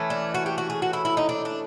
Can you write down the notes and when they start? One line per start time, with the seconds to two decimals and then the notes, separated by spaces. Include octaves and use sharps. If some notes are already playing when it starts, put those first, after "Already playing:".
Already playing: E3 A3 C#4
0.10 D4
0.34 F#4
0.46 G4
0.58 F#4
0.70 G#4
0.82 F#4
0.93 E4
1.05 E4
1.17 D#4
1.29 D4
1.45 D4